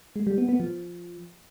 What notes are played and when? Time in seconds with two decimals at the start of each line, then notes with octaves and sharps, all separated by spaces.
0.16 G#3
0.27 G3
0.38 B3
0.49 B3
0.60 F3